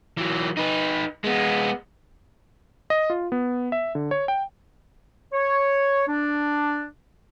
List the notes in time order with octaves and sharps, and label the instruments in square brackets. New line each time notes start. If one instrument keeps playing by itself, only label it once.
[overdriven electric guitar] E3 F#3
D#4 B4
G#3 B3
[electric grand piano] D#5
F4
B3
E5
D3
C#5
G5
[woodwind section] C#5
D4